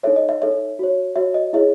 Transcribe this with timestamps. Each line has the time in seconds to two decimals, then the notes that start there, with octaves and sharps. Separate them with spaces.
0.03 D#4 A4 C#5 E5
0.16 D#5
0.29 E5
0.41 D#4 A4 C#5 E5
0.79 F#4 C#5
1.16 F#4 C#5 E5
1.34 D#5
1.53 E4 G#4 C#5 E5